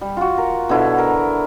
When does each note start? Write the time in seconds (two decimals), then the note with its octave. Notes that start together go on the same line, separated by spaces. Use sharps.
0.01 G3
0.17 F4 F#4
0.38 A#4
0.69 B2 D3 E4
0.98 A#4